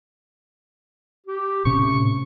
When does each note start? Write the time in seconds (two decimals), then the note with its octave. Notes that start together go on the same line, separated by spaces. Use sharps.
1.26 G4
1.65 A2 C3 C#4 C#6